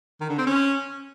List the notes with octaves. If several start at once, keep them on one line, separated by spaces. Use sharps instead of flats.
D#3
D3
C4
C#4